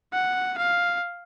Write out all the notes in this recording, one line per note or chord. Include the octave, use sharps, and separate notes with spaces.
F#5
F5